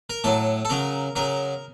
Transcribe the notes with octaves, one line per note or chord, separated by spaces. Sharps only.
A#4
A2 F#3 A4
A4
C#3 F#3 A#4
C#3 F#3 A#4